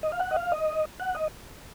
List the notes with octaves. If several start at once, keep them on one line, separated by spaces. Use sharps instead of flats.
D#5
F5
F#5
D#5
F5
D#5
F#5
D#5